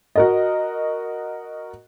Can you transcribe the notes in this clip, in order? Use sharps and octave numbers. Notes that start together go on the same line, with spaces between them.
F#4 A#4 D#5